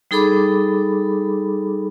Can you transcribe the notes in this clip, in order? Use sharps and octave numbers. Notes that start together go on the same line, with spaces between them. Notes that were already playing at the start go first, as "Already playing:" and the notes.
G3 D#4 G#4 A4 B5 D6